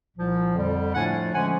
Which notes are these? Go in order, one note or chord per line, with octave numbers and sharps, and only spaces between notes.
C2 A#2 F3
F2 D3 G3
A2 F3 A3 D4 F4 F#5 G#5
D3 F3 G#3 C#4 F#5 G#5